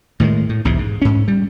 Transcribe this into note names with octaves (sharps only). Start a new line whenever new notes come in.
A2 D#3 G3 G#3
A2
B1 E2 G#2 C3
G#2
G#2 C#4
G3